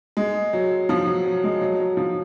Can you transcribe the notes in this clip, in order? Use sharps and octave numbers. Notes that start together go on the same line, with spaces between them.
G#3
F#3
F3
F#3
F#3
G#3
F#3
F#3
F3